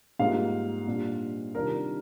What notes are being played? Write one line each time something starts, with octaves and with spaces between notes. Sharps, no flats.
G#2 G3 A#3 F4 F5
A#2 G3 D4 F4
C3 D#3 G3 D4 F4 A#4